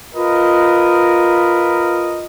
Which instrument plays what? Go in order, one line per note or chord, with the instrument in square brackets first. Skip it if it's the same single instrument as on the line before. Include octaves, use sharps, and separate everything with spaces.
[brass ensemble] F4 A#4 B4 D#5